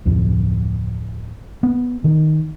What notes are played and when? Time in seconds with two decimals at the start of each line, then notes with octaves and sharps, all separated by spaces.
0.06 D1 F2
1.63 B3
2.04 D#3